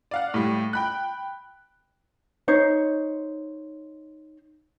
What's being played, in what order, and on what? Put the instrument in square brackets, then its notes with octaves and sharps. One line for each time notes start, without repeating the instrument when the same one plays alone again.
[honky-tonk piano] D5 F5 F#5
A2 G3
G5 B5 F#6
[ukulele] D#4 C5 C#5